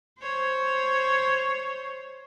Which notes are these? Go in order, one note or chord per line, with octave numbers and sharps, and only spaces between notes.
C5 C#5